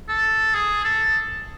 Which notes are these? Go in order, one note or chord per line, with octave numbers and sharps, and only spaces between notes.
A4
G#4
A4